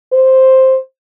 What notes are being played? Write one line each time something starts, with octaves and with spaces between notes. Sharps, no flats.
C5